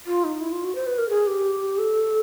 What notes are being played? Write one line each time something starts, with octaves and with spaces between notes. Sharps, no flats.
F4
D#4
E4
F4
F#4
C5
B4
A#4
G#4
G4
A4